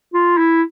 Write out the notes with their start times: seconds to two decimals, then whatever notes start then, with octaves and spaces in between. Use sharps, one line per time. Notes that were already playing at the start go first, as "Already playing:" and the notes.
0.14 F4
0.38 E4